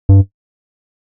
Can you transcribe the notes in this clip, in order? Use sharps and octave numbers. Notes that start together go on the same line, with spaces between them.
G2